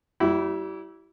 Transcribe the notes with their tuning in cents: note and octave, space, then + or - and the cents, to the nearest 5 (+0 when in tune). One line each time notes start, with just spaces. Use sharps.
G3 -35 E4 +0 G4 -35